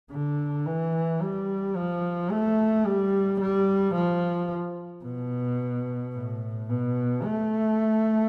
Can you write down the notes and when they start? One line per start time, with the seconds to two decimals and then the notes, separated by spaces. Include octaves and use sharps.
0.11 D3
0.66 E3
1.21 G3
1.76 F3
2.31 A3
2.86 G3
3.40 G3
3.95 F3
5.05 B2
6.15 A2
6.70 B2
7.24 A3